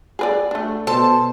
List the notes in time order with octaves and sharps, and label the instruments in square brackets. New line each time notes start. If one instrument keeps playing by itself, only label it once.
[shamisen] G#4 B4 D5
A3 D4
[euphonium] B2 [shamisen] A4 [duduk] C5 [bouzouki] A5